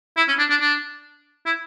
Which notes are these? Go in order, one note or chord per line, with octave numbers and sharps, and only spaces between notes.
E4
C#4
D4
D4
D4
E4